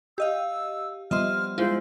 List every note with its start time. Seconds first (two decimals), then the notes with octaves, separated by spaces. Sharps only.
0.18 G4 D#5 F5 E6
1.11 F3 G3 B3 D#5 E5 C6 F6
1.58 G#3 E4 F4 C5